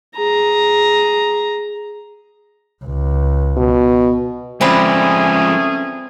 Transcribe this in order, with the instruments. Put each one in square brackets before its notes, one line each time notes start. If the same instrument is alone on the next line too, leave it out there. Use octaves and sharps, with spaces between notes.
[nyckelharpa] G#4 A#5
[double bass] C#2
[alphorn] B2
[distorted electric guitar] F3 G#3 [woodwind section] A3 C#4 G#4 [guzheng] C4 B4 D5